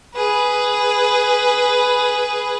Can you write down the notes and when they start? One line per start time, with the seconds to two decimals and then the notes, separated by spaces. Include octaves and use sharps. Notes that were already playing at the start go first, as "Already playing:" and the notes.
0.15 G#4 B4